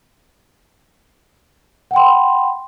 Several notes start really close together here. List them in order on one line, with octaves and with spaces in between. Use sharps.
F#5 G5 C6 B5